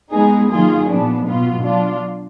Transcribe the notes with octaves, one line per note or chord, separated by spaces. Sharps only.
G#3 B3 D#4 G#4
D#3 F#3 A#3 F4 G#4
A#2 F3 B3 D4
B2 F#3 B3 F4
F#3 D4 F4